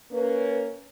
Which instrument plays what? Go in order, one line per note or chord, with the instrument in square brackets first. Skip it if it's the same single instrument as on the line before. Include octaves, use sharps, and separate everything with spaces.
[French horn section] A#3 C#4 [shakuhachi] B4